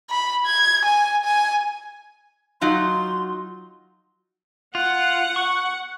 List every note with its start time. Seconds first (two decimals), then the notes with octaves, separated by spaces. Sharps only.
0.10 B5
0.46 G#6
0.85 G#5
1.24 G#5
2.61 F#3 D#4 F4 C6
4.75 F4 F#5
5.36 C#6